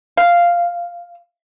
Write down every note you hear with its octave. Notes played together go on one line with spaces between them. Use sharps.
F5